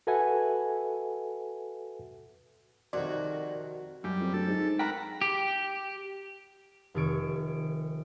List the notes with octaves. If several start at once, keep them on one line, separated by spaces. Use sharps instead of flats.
F#4 A4 B4 E5 F#5 G#5
C2 F2 D#3 F#4 D5
F#2 G3
F2
D2 A4
G#2
A#4 F#5 G5 A#5 B5
G4
F1 D#3 A4 C#5 D7